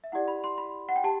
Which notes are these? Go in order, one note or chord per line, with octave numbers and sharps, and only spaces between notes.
E5
E4 G4 D5 F#5
B5
C6
B5
F#5
G5
G4 A5